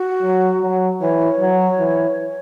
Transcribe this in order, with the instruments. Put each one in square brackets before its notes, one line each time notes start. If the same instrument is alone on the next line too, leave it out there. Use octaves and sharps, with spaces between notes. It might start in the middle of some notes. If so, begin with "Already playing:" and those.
Already playing: [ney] F#4
[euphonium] F#3
F#3
[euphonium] E3 [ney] C#5
[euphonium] F#3
E3